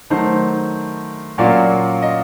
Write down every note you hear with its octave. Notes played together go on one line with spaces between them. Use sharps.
D#3 F#3 A3 C5
A#2 F#3 A#3 C#4 F4 D5
D#5